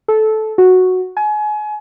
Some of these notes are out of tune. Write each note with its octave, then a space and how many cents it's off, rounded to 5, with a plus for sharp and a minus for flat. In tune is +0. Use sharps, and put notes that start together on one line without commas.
A4 -15
F#4 -5
G#5 +30